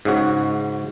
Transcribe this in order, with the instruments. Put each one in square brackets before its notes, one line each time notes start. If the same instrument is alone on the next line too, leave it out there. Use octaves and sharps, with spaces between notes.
[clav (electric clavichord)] G#2 C#3 F#4